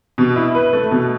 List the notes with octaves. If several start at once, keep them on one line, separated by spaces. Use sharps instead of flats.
B2
E4
B4
A3
B2